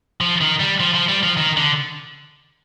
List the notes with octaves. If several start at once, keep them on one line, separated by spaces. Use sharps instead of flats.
F3
D#3
G3
F3
F3
G3
F3
D#3
D3